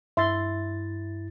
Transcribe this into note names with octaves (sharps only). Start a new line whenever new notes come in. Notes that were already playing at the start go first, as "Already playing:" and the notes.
G2 E4 E5 C6 A6